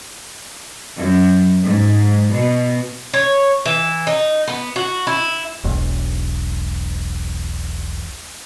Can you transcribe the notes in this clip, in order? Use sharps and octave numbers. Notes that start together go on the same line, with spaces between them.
F#2
G#2
B2
C#5
E3
D#4
B3
F#4
E4
E1 B1